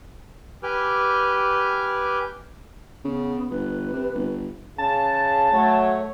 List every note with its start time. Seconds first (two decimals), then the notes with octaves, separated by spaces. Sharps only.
0.63 G4 B4 G#5 D6 F6 G6
3.05 C#3 B3
3.50 G1 B4
3.93 C3
4.14 G1
4.78 C#3 A5
5.53 F#3 A3 C#5